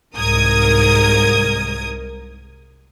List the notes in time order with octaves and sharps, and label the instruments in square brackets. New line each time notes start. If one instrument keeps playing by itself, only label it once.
[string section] C2 G#2 A#4 D#6 G#6